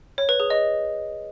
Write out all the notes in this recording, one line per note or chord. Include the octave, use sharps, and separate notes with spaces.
C#5
B4
G#4
D#5